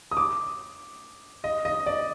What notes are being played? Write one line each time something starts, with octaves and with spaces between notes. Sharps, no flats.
D#6
D6
D#5
D#5
D5